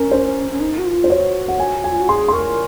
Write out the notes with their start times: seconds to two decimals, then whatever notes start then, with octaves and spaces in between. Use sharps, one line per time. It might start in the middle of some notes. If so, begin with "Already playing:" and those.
Already playing: C#4 A#4
0.11 C5
0.52 C#4
0.60 D#4
0.78 F#4
0.86 F4
1.04 C5
1.10 F#4 C#5
1.48 F#5
1.59 G#5
1.84 G#5
1.92 F4
2.01 F#4
2.09 G#4 C6
2.28 C6
2.33 A#4 C#6